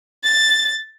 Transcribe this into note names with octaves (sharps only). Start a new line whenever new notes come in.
A6